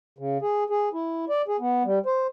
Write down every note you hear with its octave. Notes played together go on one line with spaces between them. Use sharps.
C#3
G#4
G#4
E4
D5
G#4
B3
G3
C5